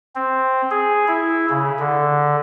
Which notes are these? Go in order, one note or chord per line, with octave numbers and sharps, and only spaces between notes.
C4
G#4
E4
C#3
D3